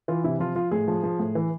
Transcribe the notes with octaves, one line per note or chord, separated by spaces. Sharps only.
E3 F4
C3 E4
F3 F4
F3 F4
A2 G#4
F3
F3
A2
E3